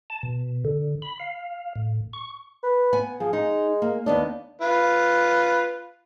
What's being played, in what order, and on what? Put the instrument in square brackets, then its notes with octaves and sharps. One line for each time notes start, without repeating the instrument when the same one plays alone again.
[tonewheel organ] A5
B2
D3
B5
F5
A2
C#6
[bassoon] B4
[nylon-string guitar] B3 G#5
[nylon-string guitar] F3 [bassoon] G#4
[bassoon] G#3 [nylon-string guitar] D#4
[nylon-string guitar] A#3
[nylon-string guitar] D#2 B3 D#5 [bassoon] D4
[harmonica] F4 B4